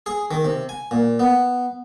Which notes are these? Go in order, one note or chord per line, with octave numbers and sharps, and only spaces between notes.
G#4
D#3
C3
G#5
A#2
B3